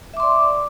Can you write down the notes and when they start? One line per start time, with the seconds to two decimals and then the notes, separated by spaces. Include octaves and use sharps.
0.14 E5
0.17 D6
0.20 C6
0.23 D5